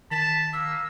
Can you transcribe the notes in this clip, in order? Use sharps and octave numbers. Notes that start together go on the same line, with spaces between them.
D#3 A5 B6
A#3 E6